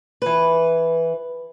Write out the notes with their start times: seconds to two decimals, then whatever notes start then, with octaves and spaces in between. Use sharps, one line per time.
0.22 E3 B4